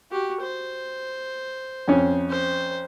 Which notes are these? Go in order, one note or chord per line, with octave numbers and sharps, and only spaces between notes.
F#4 G4
C5
F2 C#4
C5